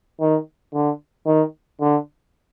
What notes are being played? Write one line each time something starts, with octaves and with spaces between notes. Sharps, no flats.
D#3
D3
D#3
D3